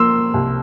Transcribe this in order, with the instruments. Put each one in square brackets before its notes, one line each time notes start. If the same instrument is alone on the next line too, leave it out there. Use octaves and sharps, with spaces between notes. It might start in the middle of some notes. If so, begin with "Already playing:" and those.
Already playing: [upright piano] F3 A#3 [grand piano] C6 E6
[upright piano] C2